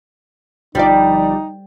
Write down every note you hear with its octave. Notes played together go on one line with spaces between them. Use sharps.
G1 F3 G3 D#4 D5